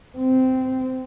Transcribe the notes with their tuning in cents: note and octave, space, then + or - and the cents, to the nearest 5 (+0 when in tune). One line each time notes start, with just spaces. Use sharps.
C4 -15